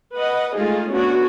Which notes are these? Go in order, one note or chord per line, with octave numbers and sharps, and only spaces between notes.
B4 D#5 F#5
G#3 A3 D#4 F4 G#4
A3 B3 C#4 D4 F#4 C#5